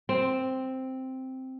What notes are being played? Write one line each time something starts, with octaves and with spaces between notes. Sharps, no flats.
C4